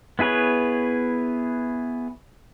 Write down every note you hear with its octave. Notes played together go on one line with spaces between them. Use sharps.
B3 E4 G#4 B4 C#5